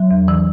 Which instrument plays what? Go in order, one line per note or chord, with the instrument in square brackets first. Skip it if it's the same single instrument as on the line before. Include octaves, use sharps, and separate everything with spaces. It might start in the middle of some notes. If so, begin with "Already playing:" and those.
Already playing: [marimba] F#3
E2
E3